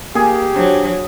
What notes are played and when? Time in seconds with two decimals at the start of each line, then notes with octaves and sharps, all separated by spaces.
0.15 A#3 G4 G#4
0.56 F#3 D4 C5